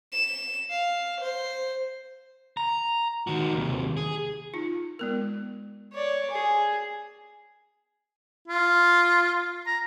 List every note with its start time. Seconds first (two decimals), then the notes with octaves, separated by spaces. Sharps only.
0.12 E7
0.70 F5
1.21 C5
2.57 A#5
3.27 D#3 F#4
3.54 D#2 C3
3.97 G#4
4.54 D#4 F4
4.99 G#3 B3 A#4
5.93 C#5 D5
6.31 G#4
8.48 F4
9.67 A#5